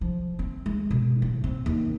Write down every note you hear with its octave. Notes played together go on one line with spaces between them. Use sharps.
F3
C4
G#3
B2
A2
C4
D#2